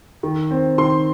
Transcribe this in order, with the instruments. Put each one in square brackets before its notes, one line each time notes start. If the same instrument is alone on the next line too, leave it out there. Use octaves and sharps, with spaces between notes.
[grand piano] D#3
C4
D#3 C6